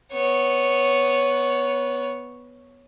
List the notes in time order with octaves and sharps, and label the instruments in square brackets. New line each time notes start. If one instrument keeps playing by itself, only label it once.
[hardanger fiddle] B3 C#5